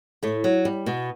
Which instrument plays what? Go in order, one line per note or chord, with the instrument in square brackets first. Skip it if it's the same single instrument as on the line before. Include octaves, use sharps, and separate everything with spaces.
[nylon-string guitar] A2 A3
F#3
G3
B2 B3